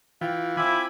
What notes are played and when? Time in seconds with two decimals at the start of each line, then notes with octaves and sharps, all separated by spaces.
0.21 E3 F4 G5
0.57 C4 E4 G#5 B5 D6